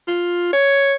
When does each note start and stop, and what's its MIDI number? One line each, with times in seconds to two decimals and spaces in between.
0.07 0.48 65
0.53 0.94 73